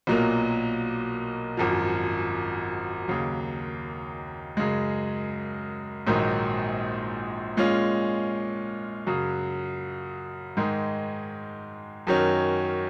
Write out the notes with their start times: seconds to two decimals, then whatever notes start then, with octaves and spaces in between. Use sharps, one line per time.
0.07 B1 A#2 F#3 A#3
1.57 G#1 F#2 F3
3.08 D#2 C#3 F#3
4.57 F#2 C#3 G#3
6.07 A#1 G#2 D#3 F#3
7.57 A#2 G#3 C#4 F4
9.07 F#2 C#3 F#3
10.57 G#2 D#3 G#3
12.07 F#2 D#3 F#3 C#4